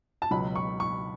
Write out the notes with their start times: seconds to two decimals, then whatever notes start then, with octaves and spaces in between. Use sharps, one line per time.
0.22 A5
0.31 C#2 B2 F#3 B5
0.56 C#6
0.80 C#6